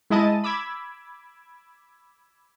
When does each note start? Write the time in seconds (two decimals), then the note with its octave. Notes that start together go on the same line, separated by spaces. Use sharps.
0.10 G#3 E4 G#4 D#5 A5 D#7
0.43 B5 D6 E6 G#6